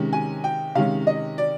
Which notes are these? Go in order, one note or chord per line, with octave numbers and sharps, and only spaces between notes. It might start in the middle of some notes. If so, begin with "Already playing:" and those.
Already playing: C3 D#3 G#3 C#4
G#5
G5
C3 D#3 G#3 C#4 F5
D#5
D5